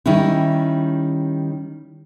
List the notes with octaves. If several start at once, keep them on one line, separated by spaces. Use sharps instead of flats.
D#3 G3 C#4 D#4 E4